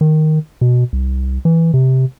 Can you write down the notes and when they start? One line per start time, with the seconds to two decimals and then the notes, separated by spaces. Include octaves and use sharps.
0.01 D#3
0.61 B2
0.93 C2
1.45 E3
1.74 C3